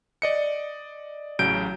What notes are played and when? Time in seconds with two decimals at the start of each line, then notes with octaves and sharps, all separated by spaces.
0.22 D5 D#5 C#7
1.39 A1 C#3 F#3 G6 D7